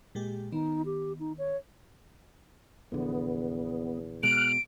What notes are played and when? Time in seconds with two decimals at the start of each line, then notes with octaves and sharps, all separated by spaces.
0.15 A#2 G#3 G4
0.52 D#3 B3 D#4
0.86 G4
1.20 D#4
1.38 C#5
2.92 A#1 E2 D3 B3
4.23 B2 G#3 F6 F#6 D7